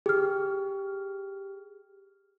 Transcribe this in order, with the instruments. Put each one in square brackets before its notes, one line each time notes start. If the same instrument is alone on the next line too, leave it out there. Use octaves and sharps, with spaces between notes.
[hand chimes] G4 [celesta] G#4 F6